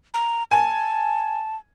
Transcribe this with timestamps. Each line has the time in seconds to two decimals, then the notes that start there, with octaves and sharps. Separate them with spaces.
0.14 A#5
0.51 G#5 A5